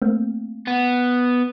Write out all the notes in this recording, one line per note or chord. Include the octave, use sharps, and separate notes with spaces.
A3 A#3 C4
B3